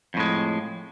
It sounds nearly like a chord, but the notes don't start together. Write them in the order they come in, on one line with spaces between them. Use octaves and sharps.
F2 A2 G#3